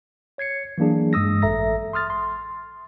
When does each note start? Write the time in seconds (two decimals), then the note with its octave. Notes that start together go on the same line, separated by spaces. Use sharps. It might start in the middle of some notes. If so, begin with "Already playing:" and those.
0.38 C#5 G#6 C7 C#7
0.78 E3 F#3 A#3 D4 G#4
1.13 G2 G#3 D#6 E6 A#6
1.42 A1 A4 E5 A#5 A#6
1.93 C6 D#6 F6 A6
2.10 C6